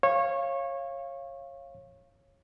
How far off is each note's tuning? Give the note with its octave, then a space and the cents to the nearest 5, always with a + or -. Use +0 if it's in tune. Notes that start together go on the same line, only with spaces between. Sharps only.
C#5 -20 F5 -10